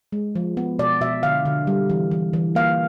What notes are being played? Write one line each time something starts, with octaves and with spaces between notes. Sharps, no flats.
G#3
F3
B3
B2 D5
B2 E5
D3 F5
D3
G3
E3
E3
E3
A#3 F5